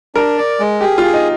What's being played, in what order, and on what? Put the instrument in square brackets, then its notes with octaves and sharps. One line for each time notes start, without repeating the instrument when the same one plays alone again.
[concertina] D4 [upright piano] A#4
[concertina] D5
G#3
[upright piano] G4 [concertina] G#4
[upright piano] F4
[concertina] G#4
[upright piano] D#4